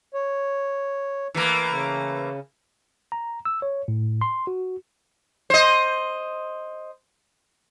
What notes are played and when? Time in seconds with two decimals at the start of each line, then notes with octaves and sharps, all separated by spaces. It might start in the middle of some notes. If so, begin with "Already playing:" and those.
0.14 C#5
1.34 E3 A3 A#3
1.69 C#3
3.12 A#5
3.45 E6
3.62 C#5
3.88 A2
4.21 C6
4.47 F#4
5.50 C5 D#5